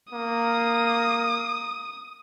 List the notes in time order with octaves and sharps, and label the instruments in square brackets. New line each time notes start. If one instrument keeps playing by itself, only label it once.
[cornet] A#3 [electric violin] D#6